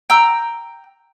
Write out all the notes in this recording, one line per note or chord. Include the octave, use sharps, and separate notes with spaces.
G5 A#5 E6